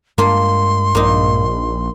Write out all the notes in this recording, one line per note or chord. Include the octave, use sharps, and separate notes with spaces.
G2 G#3 A#3 D4 F4 C6
A#1 A#3 D#4